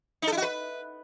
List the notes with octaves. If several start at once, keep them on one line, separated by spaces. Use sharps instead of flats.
D#4
A4
E4
F#4
B4